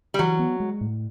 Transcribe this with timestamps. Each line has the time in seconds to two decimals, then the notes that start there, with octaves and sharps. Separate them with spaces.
0.14 G3
0.19 E3 F#3
0.39 B3
0.60 G#3
0.81 A2